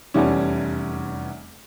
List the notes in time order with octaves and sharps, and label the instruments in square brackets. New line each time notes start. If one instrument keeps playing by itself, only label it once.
[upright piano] F1 E2 E3 G3 C#4